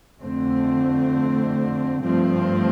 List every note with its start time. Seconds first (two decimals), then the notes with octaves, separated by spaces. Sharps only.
0.20 F2 D3 A3 C4
2.02 G2 F3 A3 C4